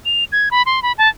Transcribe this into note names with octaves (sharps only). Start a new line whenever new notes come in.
F7
G#6
B5
C6
B5
A5